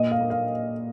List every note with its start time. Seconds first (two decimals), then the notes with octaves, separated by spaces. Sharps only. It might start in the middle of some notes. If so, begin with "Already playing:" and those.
Already playing: A#2 D#5
0.11 F5
0.20 A#3
0.30 F5